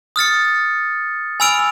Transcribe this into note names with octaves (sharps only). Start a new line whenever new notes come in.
D#6 F6 A6 C#7
G#5 B5 E6 F6 D7 F7